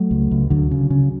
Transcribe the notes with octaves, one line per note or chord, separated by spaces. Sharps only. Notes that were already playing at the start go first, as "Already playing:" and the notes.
Already playing: F#3 A3
C#2
C#2
D2 D3 F#3
C#3
C#3